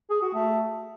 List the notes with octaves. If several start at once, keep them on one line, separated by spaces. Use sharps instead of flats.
G#4
F#4
A3